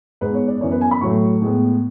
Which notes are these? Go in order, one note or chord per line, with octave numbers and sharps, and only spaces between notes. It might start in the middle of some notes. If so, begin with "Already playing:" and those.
G#2 G#3 B3 B4
C#5
D5
F#2 E3 B3 C#5
B4
G#5
B5
A2 F#3 A3 C#6
A2 G#3 B3